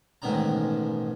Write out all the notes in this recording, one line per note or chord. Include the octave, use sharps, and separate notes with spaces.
A1 G#2 B2 D#3 D4 A#5